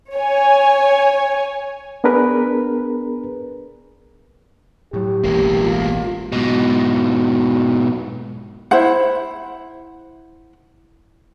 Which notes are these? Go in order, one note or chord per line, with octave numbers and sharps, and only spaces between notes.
C#5 G#5
B3 D4 G#4 A#4 B4
A2 F#3 G4
E1 A1 G#3 A#3
F4
G#2 B2
E4 C5 F#5